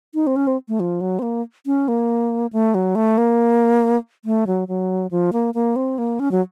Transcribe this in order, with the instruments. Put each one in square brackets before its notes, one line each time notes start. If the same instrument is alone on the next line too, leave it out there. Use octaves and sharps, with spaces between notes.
[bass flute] D#4
C4
C#4
C4
A3
F3
F#3
C4
A#3
C#4
A#3
A3
F#3
A3
A#3
A3
F#3
F#3
F3
A#3
A#3
C4
A#3
C#4
F#3